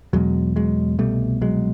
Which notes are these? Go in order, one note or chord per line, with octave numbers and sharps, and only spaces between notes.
E2 B2 F#3 G#3
F#3 G#3
C2 B2 G3 A3
F#3 G#3